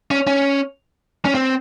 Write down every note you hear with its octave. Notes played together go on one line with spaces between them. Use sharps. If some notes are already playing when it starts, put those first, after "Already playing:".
C#4
C#4
C#4
C4